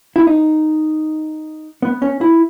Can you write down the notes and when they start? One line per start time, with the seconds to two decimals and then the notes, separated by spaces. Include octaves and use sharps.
0.16 E4
0.27 D#4
1.82 B3
2.02 C#4
2.21 E4